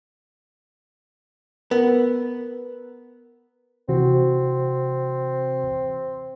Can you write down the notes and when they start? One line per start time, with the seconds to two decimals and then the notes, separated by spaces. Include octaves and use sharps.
1.71 B3 A#4
3.89 C3 E3 C4 F#4